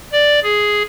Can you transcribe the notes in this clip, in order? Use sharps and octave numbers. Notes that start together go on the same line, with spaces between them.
D5
G#4